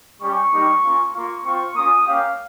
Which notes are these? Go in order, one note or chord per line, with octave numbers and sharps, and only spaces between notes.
G3 C#4 G4 C#6
G3 A#3 D#4 G4
A#3 C#4 F4
A#3 F4 C#6
C4 F4 C#6
A#3 C#4 F4 D#6
A#3 C#4 G4 F5